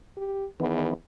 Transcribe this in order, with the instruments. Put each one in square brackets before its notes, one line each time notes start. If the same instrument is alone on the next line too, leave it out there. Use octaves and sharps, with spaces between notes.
[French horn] G4
[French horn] E2 [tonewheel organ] D#3 E3 B3